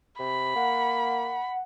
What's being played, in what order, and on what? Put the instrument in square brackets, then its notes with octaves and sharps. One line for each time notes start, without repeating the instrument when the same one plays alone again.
[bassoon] C3 [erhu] B5
[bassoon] A#3 [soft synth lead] F#5